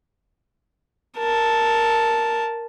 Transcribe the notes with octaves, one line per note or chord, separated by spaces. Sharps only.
A#4 A5